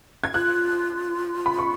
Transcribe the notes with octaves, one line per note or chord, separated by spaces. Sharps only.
G#6
F4 F#6
B5
C#6